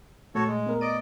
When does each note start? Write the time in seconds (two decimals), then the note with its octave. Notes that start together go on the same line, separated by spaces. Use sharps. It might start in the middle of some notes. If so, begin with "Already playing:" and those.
0.35 A#2 A3 F#4 A4 C#5
0.47 G#3
0.66 B3 A#4
0.81 D5 D#5 D7